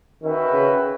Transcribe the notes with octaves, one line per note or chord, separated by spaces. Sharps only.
D#3 C#4 F#4 B4 E5 G5
C#3